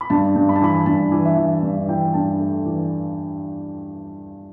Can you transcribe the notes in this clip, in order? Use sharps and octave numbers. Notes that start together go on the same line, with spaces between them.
B5
G2 A5
G2
B5
A5
E3 B5
G2 A5
E3
E5
E3
G2
E3 G5
G2 A5
A3
E3